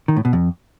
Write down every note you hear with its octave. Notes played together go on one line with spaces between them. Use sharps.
D#3
A2
B2
F2